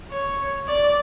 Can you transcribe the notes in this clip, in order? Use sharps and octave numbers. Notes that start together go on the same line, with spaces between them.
C#5
D5